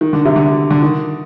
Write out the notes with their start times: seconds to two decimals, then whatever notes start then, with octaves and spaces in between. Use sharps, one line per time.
0.01 D#3
0.13 D3
0.25 C3
0.36 D3
0.71 D3
0.82 D#3